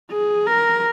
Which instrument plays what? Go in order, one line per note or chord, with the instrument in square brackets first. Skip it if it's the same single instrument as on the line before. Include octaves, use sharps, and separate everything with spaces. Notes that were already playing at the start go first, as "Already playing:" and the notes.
[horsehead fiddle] G#4
A#4